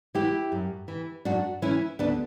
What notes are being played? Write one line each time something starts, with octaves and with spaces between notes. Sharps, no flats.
E3 E4 G4
F#2
E3
F#2 D4 F#4
E3 C#4 E4
D2 B3 D4